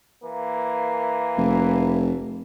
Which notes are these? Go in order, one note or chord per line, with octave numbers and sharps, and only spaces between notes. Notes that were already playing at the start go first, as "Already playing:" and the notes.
E3 A#3
F1